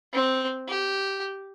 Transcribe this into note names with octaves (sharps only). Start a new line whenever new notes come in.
C4
G4